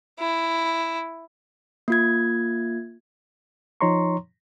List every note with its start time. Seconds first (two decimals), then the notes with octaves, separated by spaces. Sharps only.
0.19 E4
1.88 A#3 F4 G#6
3.81 F3 D#4 C#5 A#5 C6 C#6